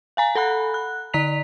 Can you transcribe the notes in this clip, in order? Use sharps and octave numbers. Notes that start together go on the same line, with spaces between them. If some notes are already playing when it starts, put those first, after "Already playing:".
F5 G#5 A#5
A4 F#5 B5 F#6
F#6
D3 D5 A#5 B6 F7